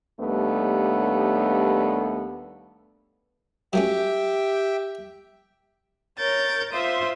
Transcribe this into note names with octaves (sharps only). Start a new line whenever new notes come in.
D#2 G3 A3 B3 D4
F#3 A3 C#4 G4 E5 G5
A#4 C#5 G6 A6
F4 C5 E5 C6 D#6